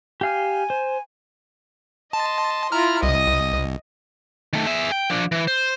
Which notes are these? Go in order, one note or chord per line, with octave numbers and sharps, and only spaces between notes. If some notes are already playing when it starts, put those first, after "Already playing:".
G4 F5 G#5 F6
C5
D#5 A5 C6
E4 F4 A#5 F6
C2 D#5 D#6
D#3 A3
G#4 E5
G5
F3 D4
E3
C5